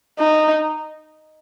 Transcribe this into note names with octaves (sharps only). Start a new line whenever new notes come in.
D#4